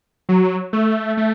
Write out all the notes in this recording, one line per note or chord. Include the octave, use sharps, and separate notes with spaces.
F#3
A3
A3